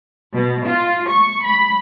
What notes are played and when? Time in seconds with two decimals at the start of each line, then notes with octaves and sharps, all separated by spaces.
0.36 B2
0.68 F4
1.10 C#6
1.46 B5